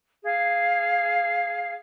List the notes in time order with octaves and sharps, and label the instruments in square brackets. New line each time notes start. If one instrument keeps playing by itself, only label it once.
[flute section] G#4 F5